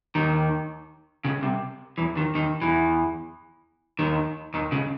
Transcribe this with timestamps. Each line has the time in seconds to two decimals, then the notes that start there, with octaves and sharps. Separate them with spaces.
0.15 D#2 D#3
1.25 C#2 C#3
1.42 C2 C3
1.98 E2 E3
2.16 D#2 D#3
2.35 D#2 D#3
2.62 E2 E3
3.99 D#2 D#3
4.54 D#2 D#3
4.72 C#2 C#3